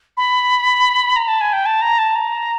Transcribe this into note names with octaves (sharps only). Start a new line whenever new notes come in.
B5
A#5
A5
G#5
G5
A5
A#5
A5
A#5